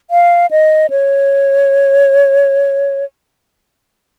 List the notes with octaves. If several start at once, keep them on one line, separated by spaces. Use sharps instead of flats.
F5
D#5
C#5